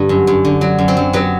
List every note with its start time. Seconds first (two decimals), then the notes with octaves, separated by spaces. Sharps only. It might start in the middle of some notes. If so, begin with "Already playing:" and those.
Already playing: G2 D3
0.09 F#2
0.27 F#2
0.45 D3
0.61 F#3
0.78 F#2
0.88 C4 C5
0.97 F#2
1.13 F#3 B3 B4